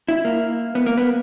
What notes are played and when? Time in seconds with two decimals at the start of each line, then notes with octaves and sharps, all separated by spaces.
0.09 E4
0.25 A#3
0.75 B3
0.86 A#3
0.97 B3